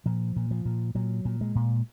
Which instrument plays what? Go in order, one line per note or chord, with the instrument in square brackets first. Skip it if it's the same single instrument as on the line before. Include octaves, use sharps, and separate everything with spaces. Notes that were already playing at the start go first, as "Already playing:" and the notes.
[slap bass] A#2 F3
A#2
F3
A#2
A#2 F#3
A#2
G#3
A#2